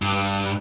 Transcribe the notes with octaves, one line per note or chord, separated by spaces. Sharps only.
G2